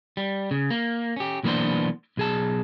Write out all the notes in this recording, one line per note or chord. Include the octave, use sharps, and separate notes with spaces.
G3
C#3
A#3
C#4 G4
B1 E3 A#3 B3 D4 C5
B1 G#4 A5